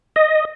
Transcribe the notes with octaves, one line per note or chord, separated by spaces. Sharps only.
D#5